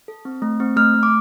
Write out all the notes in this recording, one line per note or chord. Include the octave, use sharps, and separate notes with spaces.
A4
C4
A3
C4
A3 F6
A3
D6